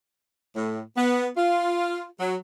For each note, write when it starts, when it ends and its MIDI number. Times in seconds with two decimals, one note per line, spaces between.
0.56 0.81 45
0.97 1.27 59
1.36 2.05 65
2.20 2.35 54